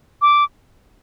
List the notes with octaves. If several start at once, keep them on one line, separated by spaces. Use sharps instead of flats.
D6